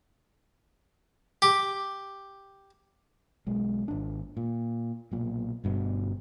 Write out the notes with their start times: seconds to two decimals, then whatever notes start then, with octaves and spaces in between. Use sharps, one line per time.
1.42 G4
3.47 B1 G#3
3.88 G#1 D4
4.37 A#2
5.11 B1 A#2
5.64 G1 G2 B2